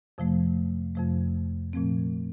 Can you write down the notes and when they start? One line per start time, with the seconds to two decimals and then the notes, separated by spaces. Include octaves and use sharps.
0.18 F2 C3 F3 A3
0.95 F2 C3 F3 A3
1.73 A#2 F3 A3 C4